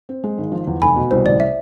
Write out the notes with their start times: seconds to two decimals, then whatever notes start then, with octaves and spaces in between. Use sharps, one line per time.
0.09 C4
0.24 G#3
0.38 G#1
0.52 F3
0.67 E2
0.82 F1 G#5 B5
0.96 B2
1.11 C2 C5
1.26 A1 D5
1.40 E5